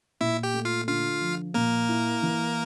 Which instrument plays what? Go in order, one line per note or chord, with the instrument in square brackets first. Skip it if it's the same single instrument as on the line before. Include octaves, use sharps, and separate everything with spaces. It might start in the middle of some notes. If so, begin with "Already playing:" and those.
[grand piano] A#2 [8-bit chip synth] E4 E5
[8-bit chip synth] G4 G5
[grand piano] A3
[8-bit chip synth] F4 F5
[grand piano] D3 [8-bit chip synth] F4 F5
[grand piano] F3
[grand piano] A#2 [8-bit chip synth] A#3 A#4
[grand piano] E4
E3